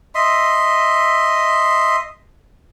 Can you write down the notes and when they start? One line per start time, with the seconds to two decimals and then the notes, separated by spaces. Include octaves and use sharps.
0.15 D#5 E5 C6